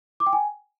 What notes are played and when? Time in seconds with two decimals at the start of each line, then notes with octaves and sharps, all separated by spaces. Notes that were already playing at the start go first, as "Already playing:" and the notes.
0.20 D6
0.26 G5
0.33 G#5